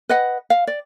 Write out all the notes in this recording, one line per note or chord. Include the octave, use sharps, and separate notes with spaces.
B4 D#5 F#5
F5
D5